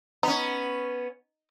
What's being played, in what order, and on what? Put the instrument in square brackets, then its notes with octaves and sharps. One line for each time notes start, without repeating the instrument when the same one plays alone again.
[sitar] B3 C#4 [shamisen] D#4